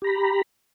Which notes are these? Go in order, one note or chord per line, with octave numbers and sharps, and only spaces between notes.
G4 A#5 B5